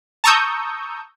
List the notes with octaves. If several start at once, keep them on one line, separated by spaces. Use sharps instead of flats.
A5 A#5 C#6 D#6 E6 G6